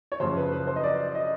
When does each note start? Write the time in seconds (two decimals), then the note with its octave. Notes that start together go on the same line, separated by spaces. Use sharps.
0.12 C#5
0.20 F#2 C#3 F3 C5
0.36 B4
0.52 B4
0.67 C5
0.76 D#5
0.83 D5
1.15 D#5